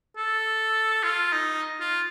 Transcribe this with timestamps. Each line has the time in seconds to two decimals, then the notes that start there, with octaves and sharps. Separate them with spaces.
0.17 A4
1.03 F4
1.32 D#4
1.80 F4